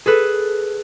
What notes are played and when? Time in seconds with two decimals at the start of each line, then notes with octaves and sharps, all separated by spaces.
0.06 G#4 A4 B4